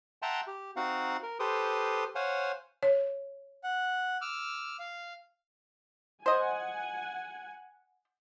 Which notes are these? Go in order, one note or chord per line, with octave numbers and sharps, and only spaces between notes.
E5 F#5 G5 A5 A#5 C6
G4
C4 D#4 F#4 F5 F#5
A#4
G4 A4 B4 C5 C6 D#6
C5 C#5 F5 F#5 G#5
C#5
F#5
D6 E6 F6
F5
C5 D#5 F#5 G#5